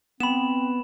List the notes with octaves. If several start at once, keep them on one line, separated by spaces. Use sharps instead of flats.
B3 C4 B5 E7